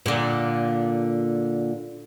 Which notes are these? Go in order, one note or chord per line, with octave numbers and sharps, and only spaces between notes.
A#2 D3